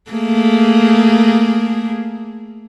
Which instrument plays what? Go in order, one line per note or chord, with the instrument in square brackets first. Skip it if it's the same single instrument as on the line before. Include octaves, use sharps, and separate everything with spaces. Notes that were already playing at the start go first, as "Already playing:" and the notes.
[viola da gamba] A3 A#3 G#4